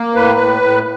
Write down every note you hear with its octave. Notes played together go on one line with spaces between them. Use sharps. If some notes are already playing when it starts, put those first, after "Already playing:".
Already playing: A#3
A2 B4
A2
A2